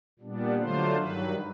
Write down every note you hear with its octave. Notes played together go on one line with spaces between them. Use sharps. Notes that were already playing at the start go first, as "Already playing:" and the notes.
A#2 G3 B3 D4
D3 F#3 A3 D4 F4 C5
G2 D#3 F#3 B4